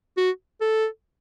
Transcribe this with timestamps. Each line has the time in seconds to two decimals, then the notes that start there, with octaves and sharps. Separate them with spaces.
0.18 F#4
0.61 A4